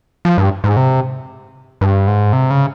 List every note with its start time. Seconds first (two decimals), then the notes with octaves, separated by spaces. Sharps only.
0.25 F3
0.38 G2
0.64 G#2
0.77 C3
1.81 G2
2.08 G#2
2.33 C3
2.50 C#3